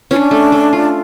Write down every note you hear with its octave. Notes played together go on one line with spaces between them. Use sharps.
C#4 F4
D4
A3
A3
F4